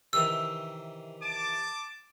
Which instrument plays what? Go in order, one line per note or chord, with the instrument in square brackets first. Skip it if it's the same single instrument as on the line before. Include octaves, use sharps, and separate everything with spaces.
[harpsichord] C3 D#3 E3 [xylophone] E6
[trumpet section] A5 D6